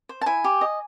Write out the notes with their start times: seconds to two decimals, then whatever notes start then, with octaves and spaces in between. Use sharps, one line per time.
0.09 C5
0.21 A5
0.26 E4 G#5
0.44 G4
0.61 D#5